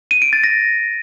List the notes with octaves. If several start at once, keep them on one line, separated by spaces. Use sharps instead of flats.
D#7
D7
A6
A#6